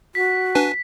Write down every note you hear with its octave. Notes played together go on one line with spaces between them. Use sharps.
F#4 B6
D4 B4 G#5